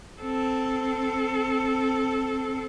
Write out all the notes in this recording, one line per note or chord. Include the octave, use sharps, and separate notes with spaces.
C4 A4